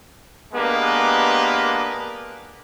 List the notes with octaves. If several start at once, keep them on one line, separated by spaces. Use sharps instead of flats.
G#3 A#3 B3 D4 G4 B4